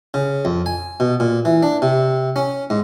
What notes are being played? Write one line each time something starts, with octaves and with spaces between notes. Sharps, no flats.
C#3
F2
G#5
B2
A#2
E3
D4
C3
C#4
G#2